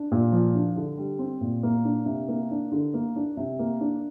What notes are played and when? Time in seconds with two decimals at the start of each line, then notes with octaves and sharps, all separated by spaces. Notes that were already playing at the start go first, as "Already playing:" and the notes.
Already playing: D4
0.12 A#2
0.32 F3
0.54 D4
0.76 D3
0.98 G3
1.19 C4
1.41 A#2
1.63 A#3
1.84 D4
2.06 C3
2.28 A#3
2.51 D4
2.72 D3
2.94 A#3
3.16 D4
3.37 C3
3.59 A#3
3.80 D4